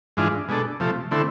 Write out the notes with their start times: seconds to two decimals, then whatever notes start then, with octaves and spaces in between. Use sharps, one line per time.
0.17 G#2 E3 G#3 D4 F4
0.48 B2 G#3 D4 A4
0.80 C3 F3 A3
1.11 D3 A3 C4 E4